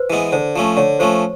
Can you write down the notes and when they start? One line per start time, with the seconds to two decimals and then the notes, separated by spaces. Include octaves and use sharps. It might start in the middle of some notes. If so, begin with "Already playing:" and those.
Already playing: B4 C5
0.10 E3 G#3 B3
0.32 D3 C5
0.56 F3 A3 C#4
0.77 D3 C#5
0.99 F3 A3 C#4 C5